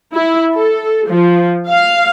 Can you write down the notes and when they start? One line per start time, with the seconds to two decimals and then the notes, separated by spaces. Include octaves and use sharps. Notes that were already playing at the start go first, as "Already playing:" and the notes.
0.14 E4
0.53 A4
1.08 F3
1.69 F5